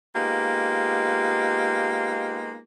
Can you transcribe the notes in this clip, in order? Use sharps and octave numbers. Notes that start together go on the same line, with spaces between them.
G#3 A#3 B3 D#4 F4 G4